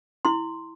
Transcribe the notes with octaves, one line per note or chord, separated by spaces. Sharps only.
E4 C6